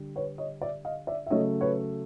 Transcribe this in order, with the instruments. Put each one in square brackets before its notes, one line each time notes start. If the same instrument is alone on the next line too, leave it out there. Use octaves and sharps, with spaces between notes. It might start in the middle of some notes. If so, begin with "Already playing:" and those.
Already playing: [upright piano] D3 G3
B4 C#5
C#5 D#5
D5 E5
D#5 F5
D5 E5
E5
C#3 F#3 A3 C#5 D#5
B4 C#5